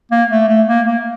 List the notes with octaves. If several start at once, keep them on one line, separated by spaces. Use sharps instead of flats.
A#3
A3
A3
A#3
A#3